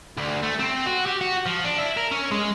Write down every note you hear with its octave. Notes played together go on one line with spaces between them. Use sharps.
D2
A3
C4
F#4
G4
F#4
F3
D4
E4
A#4
C#4
G#3